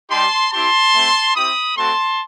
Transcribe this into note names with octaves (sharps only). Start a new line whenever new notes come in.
G3 D#4 G4 A5 C6
C4 E4 G4 A5 C6
A3 C4 E4
C4 E4 G4 B5 D#6
A3 C4 F#4 A5 C6